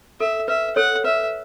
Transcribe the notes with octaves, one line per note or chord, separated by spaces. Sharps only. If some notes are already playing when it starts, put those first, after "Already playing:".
A4 E5
B4 E5
A4 C#5 F#5
B4 E5